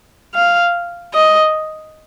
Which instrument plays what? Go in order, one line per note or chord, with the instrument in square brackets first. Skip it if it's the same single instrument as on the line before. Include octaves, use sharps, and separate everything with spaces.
[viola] F5
D#5